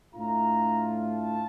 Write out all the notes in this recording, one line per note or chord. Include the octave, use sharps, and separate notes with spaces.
A2 A3 D4 F4 A#5
A5